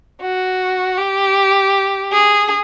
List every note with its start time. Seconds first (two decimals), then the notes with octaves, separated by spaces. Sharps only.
0.22 F#4
0.97 G4
2.12 G#4